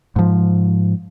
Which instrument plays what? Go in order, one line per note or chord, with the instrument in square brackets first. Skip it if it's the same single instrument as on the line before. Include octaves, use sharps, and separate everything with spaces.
[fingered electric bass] G#2 F3